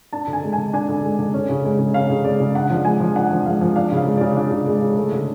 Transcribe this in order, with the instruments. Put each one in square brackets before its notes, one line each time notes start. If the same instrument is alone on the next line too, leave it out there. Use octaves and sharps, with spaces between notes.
[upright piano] D4 A5
D3
G#5
G#3
D3 G#5
D4 G#5
D3
G#3
D3
C#4
C#3
G#3
C#3
C#4 F5
C#3
G#3 D5
C#3
D4 F#5
F3
G#3 G#5
F3
D4 F#5
F3
G#3 F5
F3
D4 F5
C#3 F5
G#3
C#3 D5
D4 F5
C#3
G#3
C#3
A3
D3